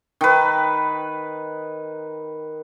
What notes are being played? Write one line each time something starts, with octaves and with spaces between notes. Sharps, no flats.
D#3 B4